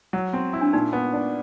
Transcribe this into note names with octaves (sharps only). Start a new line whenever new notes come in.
F#3
C4
E4
D4
A#2 D#4
B3
D4